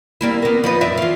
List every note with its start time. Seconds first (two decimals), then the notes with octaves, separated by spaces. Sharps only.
0.21 G3 A#3 E4
0.42 A#3 B3
0.64 F3 D#4 B4
0.81 F#2 D5 E5
0.98 E3 F4